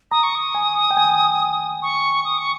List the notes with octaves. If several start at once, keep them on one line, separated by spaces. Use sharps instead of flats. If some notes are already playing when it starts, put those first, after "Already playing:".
A#5 D#6
C#6
D#6
G#5
G5
G#5
C#6
D#6
C#6